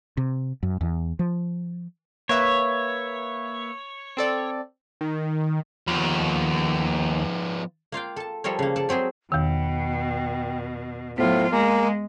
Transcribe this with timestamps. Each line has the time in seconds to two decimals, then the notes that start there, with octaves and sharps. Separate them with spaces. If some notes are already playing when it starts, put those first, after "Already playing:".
0.17 C3
0.63 F#2
0.81 E2
1.19 F3
2.29 A#3 B4 C#5 E5
4.17 C4 A4 D5
5.01 D#3
5.88 D#2 F3 B3
7.92 A#3 F4 F5 G5
8.16 A4 A5
8.44 F3 G3 A4 A#4 C#5
8.59 C#3 A#3
8.76 A4 D5 A5
8.89 F#3 C4 G4 G#4
9.32 E2 B2 D#3 G5
11.18 A2 F#3 B3 F4 C5
11.52 G#3 A#3 G#5